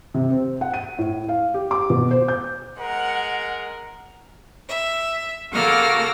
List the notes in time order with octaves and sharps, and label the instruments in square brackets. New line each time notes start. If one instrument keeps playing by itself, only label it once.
[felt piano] C3
C4
F#5
D#7
A2
F5
G4
D6
B2
C5
G6
[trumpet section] G#3 A#4 [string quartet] F#5
[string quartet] E5
C#3 A#3 F#4 A4 F6 A#6